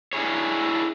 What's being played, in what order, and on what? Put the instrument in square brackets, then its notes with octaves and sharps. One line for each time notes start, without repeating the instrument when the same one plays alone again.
[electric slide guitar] D4 E4 G#4 C#5